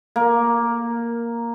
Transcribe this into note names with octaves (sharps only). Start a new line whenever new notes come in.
A#3